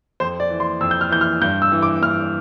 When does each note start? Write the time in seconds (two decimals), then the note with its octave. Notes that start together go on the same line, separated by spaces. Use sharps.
0.20 F2 C5
0.40 D5
0.50 E3
0.60 C6
0.81 F2 E6
0.91 G6
1.01 F6
1.11 E3 G6
1.21 F6
1.41 G2 G6
1.62 E6
1.72 E3
1.82 D6
2.02 G2 F6